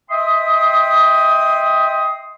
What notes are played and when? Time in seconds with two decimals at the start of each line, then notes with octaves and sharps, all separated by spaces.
0.10 D#5 E5 G5 C6 D#6